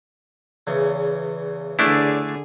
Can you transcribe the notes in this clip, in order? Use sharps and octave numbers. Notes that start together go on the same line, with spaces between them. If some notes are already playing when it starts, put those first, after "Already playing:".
E2 C#3
D3 A3 D4 E4 G#4